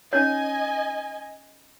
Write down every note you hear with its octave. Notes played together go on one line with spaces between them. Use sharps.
C#4 D#4 C#5 D#5 G#5